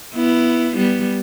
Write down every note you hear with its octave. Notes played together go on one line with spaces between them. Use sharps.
B3 E4
G3 B3